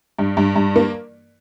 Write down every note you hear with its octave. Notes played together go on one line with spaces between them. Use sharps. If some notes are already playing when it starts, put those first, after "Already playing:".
G2
G2
G2
A#3